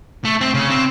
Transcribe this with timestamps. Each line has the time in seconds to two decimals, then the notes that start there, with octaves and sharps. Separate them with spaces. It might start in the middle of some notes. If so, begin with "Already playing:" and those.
0.25 A3
0.41 C4
0.54 C#3
0.70 C4